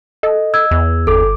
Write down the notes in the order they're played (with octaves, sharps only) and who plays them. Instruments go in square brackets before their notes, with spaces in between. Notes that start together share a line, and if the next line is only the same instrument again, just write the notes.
[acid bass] A4 [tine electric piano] D#5
[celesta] E6 G#6
[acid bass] E2
[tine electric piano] G1 D6 [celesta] A4